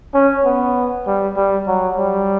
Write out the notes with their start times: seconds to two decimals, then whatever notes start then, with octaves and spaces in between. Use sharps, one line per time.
0.14 C#4
0.45 B3
1.07 G3
1.36 G3
1.67 F#3
1.98 G3